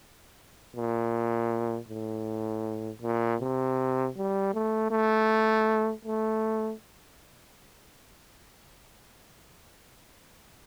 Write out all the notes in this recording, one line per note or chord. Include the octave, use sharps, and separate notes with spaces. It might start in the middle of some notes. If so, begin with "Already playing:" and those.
A#2
A2
A#2
C3
G3
A3
A3
A3